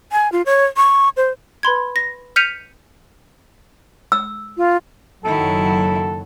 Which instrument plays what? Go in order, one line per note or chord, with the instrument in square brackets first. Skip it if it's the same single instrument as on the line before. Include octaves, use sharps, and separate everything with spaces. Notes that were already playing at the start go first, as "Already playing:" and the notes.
[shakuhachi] G#5
F4
C#5
C#6
C5
[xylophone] B4 B5 C6 G#6
A#6
F6 G6 B6 C#7 D#7 F7
[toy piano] E6
[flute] F4
[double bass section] F#1 F#3 [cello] D#3 E4 [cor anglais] A4